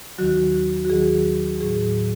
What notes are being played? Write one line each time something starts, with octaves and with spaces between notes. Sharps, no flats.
D#2 D#3 F#3 F#4
F#4
D#2 D#3 F#3 G#4
A2 F#3 G#4